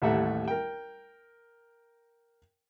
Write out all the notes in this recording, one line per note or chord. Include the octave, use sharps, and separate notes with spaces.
A1 D#2 G3 A3 E5 F#5
A#4 G5